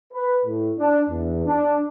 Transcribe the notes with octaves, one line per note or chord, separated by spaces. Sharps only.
B4
A2
D4
E2
D4